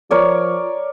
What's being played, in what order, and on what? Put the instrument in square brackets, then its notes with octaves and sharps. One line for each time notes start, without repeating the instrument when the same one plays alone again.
[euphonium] F3 [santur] A#4 C#5 D5